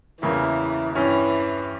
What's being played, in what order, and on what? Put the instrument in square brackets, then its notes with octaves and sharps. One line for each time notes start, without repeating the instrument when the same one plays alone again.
[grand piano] E2 C#3 G3 A#3 E4 [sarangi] E3
[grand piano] G2 G3 C#4 [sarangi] E3